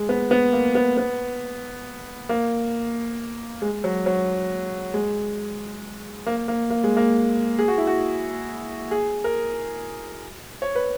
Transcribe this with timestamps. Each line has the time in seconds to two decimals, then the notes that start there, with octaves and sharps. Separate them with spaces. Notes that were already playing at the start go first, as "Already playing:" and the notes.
Already playing: G#3
0.09 B3
0.31 B3
0.53 A#3
0.75 B3
0.97 B3
2.29 A#3
3.62 G#3
3.84 F#3
4.06 F#3
4.94 G#3
6.27 A#3
6.48 A#3
6.70 A#3
6.84 G#3
6.97 A#3
7.59 G#4
7.68 F#4
7.78 E4
7.87 F#4
8.91 G#4
9.24 A#4
10.62 C#5
10.75 B4